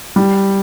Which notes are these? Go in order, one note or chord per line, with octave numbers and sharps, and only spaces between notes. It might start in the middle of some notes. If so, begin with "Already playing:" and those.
G3